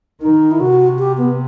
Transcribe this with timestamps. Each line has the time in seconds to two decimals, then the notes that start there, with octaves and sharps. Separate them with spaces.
0.21 D#3 D#4
0.51 E4
0.60 C3 F#4
0.99 G4
1.18 B3